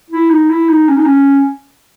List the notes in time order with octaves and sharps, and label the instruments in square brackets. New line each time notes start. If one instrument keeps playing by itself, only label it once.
[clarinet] E4
D#4
E4
D#4
C#4
D#4
C#4